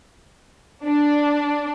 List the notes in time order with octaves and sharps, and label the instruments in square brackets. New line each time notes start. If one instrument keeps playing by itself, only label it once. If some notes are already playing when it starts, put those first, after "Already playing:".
[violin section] D4